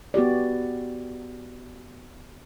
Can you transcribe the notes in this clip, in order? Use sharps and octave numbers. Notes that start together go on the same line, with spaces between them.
B3 F#4 G4 D5